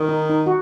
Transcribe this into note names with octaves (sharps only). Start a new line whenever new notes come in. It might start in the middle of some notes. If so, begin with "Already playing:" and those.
Already playing: D#3
D#4
D#4
F#4